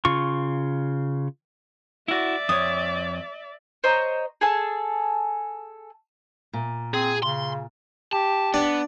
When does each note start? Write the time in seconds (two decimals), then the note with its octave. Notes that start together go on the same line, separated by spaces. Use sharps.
0.05 C#3 F4 C#6
2.08 E4 F#4 D5 E5
2.49 F2 C#5 D#6
3.84 C5 C#5 D#5 A#5
4.41 G#4 A4 G#5 A5
6.53 A#2
6.94 C4 G#4
7.23 C#3 C6
8.13 G4 A5
8.54 B3 D4